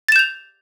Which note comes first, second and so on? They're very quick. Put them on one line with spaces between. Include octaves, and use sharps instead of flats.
A6 E7 G6 F7